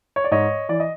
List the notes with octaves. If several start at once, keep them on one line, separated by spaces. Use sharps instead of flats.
C#5
D5
G#2 C#5 D#5
E3 D5
D#5